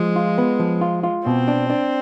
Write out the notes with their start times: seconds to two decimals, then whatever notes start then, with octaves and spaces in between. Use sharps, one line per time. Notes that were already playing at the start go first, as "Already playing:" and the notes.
Already playing: F3 G#3
0.16 F4
0.38 B3
0.59 F3
0.81 F4
1.03 F4
1.26 B2 C4
1.48 D4
1.70 D4